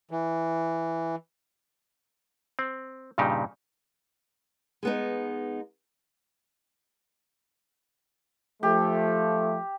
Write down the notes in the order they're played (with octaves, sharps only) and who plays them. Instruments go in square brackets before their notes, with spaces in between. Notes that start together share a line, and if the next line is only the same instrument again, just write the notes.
[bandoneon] E3
[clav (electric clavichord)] C4
G2 A#2 C#3 D#4 G4
[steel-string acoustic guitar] G#3 B3 D#4
[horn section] F3 A3 [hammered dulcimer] G4